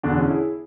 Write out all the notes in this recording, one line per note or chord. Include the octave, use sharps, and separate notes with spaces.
E1 E2 D3 D4 F#4
C#4 E4
E4 G#4